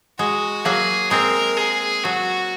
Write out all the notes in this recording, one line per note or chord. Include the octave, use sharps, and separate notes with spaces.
G#3 F#4
F#3 A#3 G#4
G#3 C4 A#4
G#4
F#3 F#4